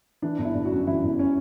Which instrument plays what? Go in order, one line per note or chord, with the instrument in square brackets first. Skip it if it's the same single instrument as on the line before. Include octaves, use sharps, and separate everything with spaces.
[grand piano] E3 D4
G1
E4
G1
F#4
F#2
E3 E4
G1
C#4